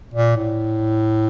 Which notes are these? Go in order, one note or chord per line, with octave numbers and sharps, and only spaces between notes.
A#2
A2